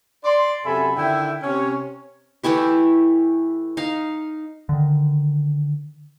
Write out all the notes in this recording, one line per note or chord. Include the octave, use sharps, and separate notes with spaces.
D5 C6
F#2 C3 A4 E5 G#5 B5
D3 D#3 E4 E5 G5
C3 C#4 C#5
E3 A3 E4 G4
D#4 F5
D3 D#3